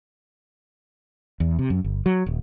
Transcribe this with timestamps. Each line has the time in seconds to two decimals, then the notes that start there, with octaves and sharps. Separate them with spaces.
1.40 E2
1.59 C3
1.70 F#2
1.84 G1
2.06 F#3
2.26 D#1